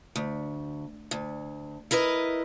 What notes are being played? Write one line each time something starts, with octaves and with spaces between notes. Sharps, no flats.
D2
D2
E4 A#4 B4 D#5